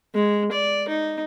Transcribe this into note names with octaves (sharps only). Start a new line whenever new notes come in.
G#3
D5
D#4